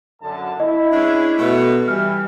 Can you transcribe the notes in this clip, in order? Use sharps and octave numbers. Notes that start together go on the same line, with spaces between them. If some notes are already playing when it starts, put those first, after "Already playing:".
F#2 D3 A5
E4 D#5
G#3 C#4 D4
B2 A3
E3 G3 F6